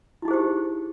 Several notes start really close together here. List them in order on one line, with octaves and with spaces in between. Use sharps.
E4 D#4 G#4 C5 G4